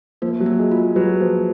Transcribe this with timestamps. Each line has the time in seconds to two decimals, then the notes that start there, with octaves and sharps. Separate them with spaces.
0.22 F3 A#3
0.40 F#3
0.46 A#3
0.59 G#3
0.71 F4
0.78 G#3
0.96 F#3 B4
1.21 F3 A#3